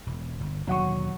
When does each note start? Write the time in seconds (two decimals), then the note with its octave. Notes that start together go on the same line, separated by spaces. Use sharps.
0.07 E1
0.41 G1
0.67 D#2 B2 D3 F#3 F#5 C#6